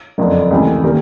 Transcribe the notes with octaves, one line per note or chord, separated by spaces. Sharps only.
F#1 F2 D3
C#2 C3 E3 A3
D#3 G3 A#3